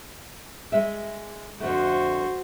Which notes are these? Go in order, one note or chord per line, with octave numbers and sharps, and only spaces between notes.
G#3 E5
F2 D3 A3 F#4 C5